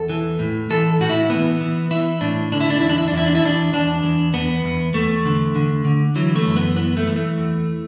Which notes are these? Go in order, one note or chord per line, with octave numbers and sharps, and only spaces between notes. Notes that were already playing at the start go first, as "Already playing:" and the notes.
Already playing: E2 A4
E3
A2
E3 A4
A2 F#4
E4
E3 B3
E3
E3 E4
A2 D4
D3 D4
E4
D4
E2 E4
D4
E4
D4
E2
E4
D4
E4
E2 D4
E2 D4
E2
E2 B3
E2
E2 A3
D3
D3
D3
E3 F#3
A3
F#2
B3
E3 B3
A3
E3
A3
E2